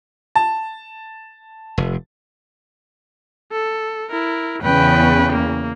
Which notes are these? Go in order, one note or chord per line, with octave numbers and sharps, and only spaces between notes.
A5
F1
A4
E4 A#4
E2 C#3 B4 G5
A#3